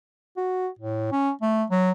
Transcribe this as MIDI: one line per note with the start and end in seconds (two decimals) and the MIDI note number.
0.37 0.68 66
0.79 1.08 45
1.12 1.31 61
1.41 1.64 57
1.70 1.91 54